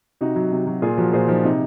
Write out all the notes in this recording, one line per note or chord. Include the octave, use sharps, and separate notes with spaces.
C3 D#4 F#4
F#3
C3
F#3
A#2 F4 G#4
F3 F#4 A#4
A#2 G#4 C5
F3 D#4
C3 D#4